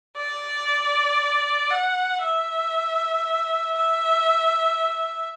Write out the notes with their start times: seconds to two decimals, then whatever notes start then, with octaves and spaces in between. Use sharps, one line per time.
0.17 D5
1.71 F#5
2.22 E5
3.75 E5